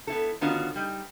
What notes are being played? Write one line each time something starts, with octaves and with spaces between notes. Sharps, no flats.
B3 E4 A4
D3 D#3 B3 C#4 F4 F#4
G3 D#4